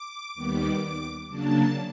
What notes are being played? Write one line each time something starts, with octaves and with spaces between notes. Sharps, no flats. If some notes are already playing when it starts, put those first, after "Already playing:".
Already playing: D6
D#2 D#3 G3 B3
C#3 F#3 A#3 D4 A5